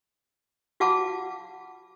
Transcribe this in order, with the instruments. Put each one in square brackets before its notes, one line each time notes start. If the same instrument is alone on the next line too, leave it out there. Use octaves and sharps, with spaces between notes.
[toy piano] F4 F#4 F5 F#5 A5 D6